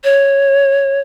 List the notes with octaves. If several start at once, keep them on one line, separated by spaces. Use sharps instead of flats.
C#5